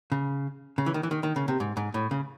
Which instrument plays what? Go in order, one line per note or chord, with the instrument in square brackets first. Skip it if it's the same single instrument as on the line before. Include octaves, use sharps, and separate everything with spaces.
[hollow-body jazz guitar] C#3
C#3
E3
D#3
E3
D#3
D#3
C#3
C3
G#2
G#2
A2
C#3